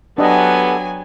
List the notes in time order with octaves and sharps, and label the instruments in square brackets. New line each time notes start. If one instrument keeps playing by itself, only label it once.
[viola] F#3 G#5 [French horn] B3 [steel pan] D4 D#5 [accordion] G4 A4 A5